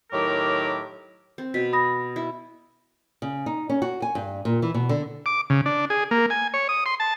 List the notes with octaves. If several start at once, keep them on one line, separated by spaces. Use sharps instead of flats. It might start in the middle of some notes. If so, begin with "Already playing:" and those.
A2 D#3 F#3 G4 A#4 D6
C4
B2 B6
B5 D#6 A#6
E4
C#3
D#4
C#4
F#4
G#5
G2
A#2
E3
B2
D3
D6
C#3
D4
G#4
A#3
G#5
C#5
D#6
C6
A5